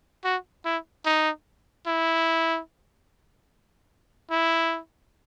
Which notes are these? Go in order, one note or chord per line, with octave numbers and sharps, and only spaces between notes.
F#4
E4
D#4
E4
E4